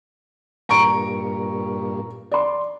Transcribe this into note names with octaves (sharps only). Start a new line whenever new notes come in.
G2 A#2 A#5 C#6 D7
D5 C6